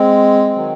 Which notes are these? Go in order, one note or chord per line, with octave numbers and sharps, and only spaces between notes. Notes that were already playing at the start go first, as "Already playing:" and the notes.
Already playing: G#3 C4
D#3 F#3